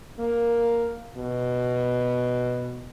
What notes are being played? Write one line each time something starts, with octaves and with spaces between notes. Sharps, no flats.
A#3
B2